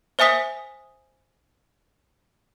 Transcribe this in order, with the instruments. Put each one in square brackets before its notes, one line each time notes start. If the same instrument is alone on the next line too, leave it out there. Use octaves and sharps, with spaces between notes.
[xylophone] C5 E5 G#5 D#6 B6